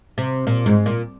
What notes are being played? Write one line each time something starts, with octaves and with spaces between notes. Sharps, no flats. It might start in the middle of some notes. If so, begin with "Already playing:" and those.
C3
A#2
G#2
A#2